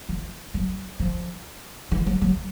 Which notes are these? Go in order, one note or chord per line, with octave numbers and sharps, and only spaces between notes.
F3
F#3
F3
E3
F#3
F#3